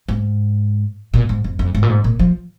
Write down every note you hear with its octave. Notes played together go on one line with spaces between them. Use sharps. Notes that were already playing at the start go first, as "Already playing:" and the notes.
G#2
A#2
G#2
F2
F2
G#2
A#2
G#2
A#2
F3